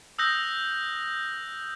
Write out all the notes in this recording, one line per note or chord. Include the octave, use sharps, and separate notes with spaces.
D#6 E6 F#6 G6 A#6